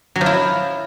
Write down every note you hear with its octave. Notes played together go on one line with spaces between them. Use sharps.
F#3
F3
E4